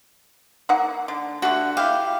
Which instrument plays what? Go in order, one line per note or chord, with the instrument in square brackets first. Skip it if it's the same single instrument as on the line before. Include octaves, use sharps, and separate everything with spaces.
[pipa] A#3 [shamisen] D#4 F#5
[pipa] D3
[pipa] D3 A3 [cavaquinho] F#4
[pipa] E4 G4 [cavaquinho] F5